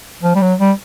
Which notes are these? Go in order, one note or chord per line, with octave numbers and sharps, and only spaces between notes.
F3
G3
F#3
G3